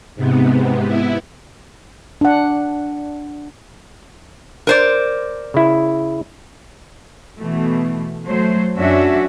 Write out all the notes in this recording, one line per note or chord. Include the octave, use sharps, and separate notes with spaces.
G#2 C3 B3
B3 E4
D4 F#5
A#4 C5 D5
C#3 E4
B2 E3 A3
F#3 A3 C5
F#2 C#4 D4 F#4 E5